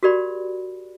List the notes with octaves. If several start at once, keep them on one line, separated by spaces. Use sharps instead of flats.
F#4 G4 A#4 D5 B5